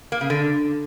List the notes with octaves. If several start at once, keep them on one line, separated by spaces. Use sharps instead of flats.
A#3
C#3
D3